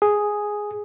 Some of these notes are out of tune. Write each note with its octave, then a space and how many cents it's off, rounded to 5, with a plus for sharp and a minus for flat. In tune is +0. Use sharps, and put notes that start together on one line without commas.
G#4 +0